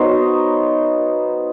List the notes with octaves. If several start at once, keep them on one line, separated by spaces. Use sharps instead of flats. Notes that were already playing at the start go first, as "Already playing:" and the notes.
Already playing: F#3 B3 D#4 C5